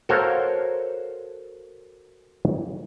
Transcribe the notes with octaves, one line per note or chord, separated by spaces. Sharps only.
F#4 A4 A#4 C5 C#5 F5